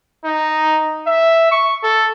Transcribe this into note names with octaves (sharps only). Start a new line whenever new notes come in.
D#4
E5
C#6
A4